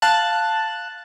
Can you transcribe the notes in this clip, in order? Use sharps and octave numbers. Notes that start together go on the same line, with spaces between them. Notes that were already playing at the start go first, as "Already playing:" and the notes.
F5 A5 F#6